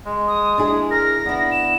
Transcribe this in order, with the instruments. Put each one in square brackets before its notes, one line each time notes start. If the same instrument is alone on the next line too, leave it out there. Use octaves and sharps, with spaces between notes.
[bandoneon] G#3
[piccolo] D#6
[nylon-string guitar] D4 E4 G#4
[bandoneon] A#4 [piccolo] A#6
[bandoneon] B3 [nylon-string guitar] D4 E4
[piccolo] E7